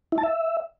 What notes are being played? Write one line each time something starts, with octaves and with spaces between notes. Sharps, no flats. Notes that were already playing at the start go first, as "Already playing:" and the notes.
E4
A5
E5